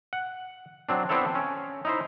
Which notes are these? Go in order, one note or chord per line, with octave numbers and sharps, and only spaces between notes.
F#5
F#3 C4 D4
B3 C4 D4 E4 A4 C#5
C#4
D#4 E4 C5